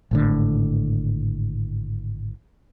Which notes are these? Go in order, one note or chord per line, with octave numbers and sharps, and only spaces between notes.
G#1 A2 D3